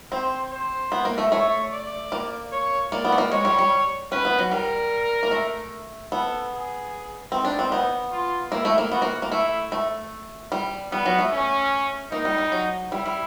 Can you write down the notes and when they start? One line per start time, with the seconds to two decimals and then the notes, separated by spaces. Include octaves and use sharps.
0.12 C4 C5
0.51 C5
0.92 B3
1.05 A#3
1.18 A3
1.32 A3 C#5
1.72 D5
2.12 A#3
2.52 C#5
2.92 A#3 D5
3.05 B3
3.12 A3
3.18 A#3
3.31 G#3 C#5
3.45 G3
3.59 G3
4.12 C#4 B4
4.25 B3
4.38 F#3
4.51 G3 A#4
5.23 A#3
5.31 A3
6.11 B3 A4
6.52 G#4
7.32 C4 D#4
7.45 D4
7.59 C4
7.72 B3
8.12 F4
8.52 A#3 E4
8.65 A3
8.78 A#3
8.91 B3 F#4
9.02 A#3
9.22 A#3
9.31 A3 E4
9.72 A3
10.52 G3
10.91 G3 B3
11.06 F#3
11.19 A3
11.32 C#4
12.11 A#3 D#4
12.25 G3
12.38 G3
12.52 F#3
12.92 G3 E4
13.06 G3